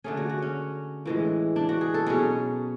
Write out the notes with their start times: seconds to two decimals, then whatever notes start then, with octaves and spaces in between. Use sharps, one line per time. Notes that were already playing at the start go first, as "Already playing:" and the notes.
0.04 D3 A3 C#4 G#4
0.17 F#4
0.29 F#4
0.42 C#4
1.06 A2 E3 G#3
1.56 D4
1.69 F#4
1.81 G#4
1.94 A4
2.06 B2 F#3 C#4 G#4